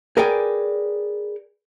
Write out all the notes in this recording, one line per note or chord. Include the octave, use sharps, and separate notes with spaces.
G#4 A#4 B4 D5 G5 G#5